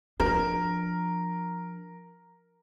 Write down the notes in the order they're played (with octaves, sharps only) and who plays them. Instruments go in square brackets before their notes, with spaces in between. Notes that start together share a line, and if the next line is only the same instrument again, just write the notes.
[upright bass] F3 D4 [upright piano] A#4